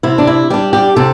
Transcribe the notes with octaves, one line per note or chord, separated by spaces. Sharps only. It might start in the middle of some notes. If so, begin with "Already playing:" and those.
C3 E4
D4
E4
G3 D4 G4
G4
C3 A4